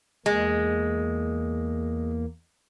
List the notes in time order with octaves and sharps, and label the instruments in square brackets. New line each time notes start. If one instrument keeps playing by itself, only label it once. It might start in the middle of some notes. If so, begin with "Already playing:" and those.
[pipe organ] E2 A#3 [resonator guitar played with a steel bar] G#3